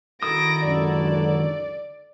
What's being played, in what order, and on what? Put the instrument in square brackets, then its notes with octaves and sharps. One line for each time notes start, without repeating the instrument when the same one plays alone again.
[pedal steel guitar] D#3 E4 D#6 [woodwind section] D#4 F#4 A4 [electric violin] A#6 D7
[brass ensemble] C#2 F#2 D3 [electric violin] D5